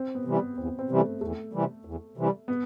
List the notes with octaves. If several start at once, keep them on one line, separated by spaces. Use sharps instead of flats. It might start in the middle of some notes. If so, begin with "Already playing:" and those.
Already playing: C4
B3
C3 E3 G3
B3
E2 C4
C4
C3 E3 G3
A3
E2 A3
C3 E3 G3
E2
C3 E3 G3
B3